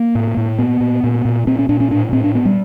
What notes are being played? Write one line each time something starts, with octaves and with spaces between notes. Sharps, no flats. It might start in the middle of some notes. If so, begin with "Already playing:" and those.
Already playing: A#3
A2
A2
A#2 B3
A#2
A#2
A#2
A#2 C4
C#4
A#2 D4
C#4
A2 D4
A2 C4
D4
A#2 B3
G3